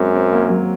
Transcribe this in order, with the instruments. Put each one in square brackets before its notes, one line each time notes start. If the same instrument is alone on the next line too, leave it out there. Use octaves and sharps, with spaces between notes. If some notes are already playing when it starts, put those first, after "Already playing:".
Already playing: [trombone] F#2 [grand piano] G#3 C4
[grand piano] C4
A#3
F#3